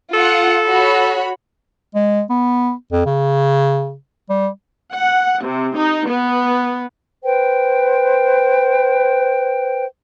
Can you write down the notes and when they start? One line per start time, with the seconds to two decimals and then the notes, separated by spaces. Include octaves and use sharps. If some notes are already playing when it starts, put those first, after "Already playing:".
0.13 F4 A4 F#5
0.68 F#4 C#5 B5
1.95 G#3
2.30 B3
2.92 F2
3.06 C#3
4.30 G3
4.95 F#5
5.43 C3
5.77 D#4
6.10 B3
7.23 B4 C5 G5